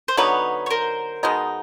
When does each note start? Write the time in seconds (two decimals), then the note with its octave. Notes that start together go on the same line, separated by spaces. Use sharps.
0.08 C5
0.17 D3 F#3 B3 D#4 B4 C#5
0.66 C#5
0.70 A#4 C5
1.23 B2 G#3 B3 D#4